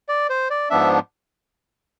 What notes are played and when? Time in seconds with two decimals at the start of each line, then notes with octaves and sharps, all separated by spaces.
0.09 D5
0.30 C5
0.50 D5
0.70 G#2 F3 B3 D4 E5